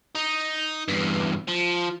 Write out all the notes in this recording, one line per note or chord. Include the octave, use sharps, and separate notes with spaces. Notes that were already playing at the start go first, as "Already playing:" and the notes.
D#4
E2 G2
F3